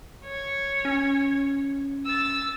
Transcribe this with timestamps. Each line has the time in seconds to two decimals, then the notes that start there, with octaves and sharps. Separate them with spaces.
0.24 C#5
0.85 C#4
2.06 E6 A6